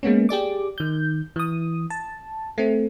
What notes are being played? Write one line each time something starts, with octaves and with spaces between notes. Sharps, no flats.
G#3 A#3 B3 C#4
G4 G#4 D5 D6
D#3 G6
E3 D#6
A5
A3 C4